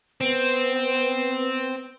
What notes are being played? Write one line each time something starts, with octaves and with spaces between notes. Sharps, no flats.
B3 C4